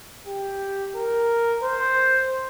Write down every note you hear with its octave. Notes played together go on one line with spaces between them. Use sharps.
G4
A#4
C5